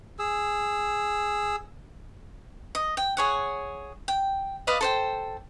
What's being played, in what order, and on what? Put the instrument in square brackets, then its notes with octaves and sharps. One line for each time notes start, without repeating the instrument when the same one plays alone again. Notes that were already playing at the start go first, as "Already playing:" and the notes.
[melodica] G#4 E6
[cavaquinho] D#5
G5
G#4 C#5 F#5
G5
B4 D5 D#5 F5
A4 C5 G5